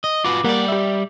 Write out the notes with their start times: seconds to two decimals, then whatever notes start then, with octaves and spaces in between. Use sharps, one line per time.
0.04 D#5
0.24 F4 F#4 B4 D6
0.44 G3 A#3 D5 F#5
0.68 G4 E5